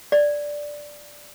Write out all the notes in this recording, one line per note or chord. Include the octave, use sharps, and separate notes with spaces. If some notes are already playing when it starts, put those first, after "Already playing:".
D5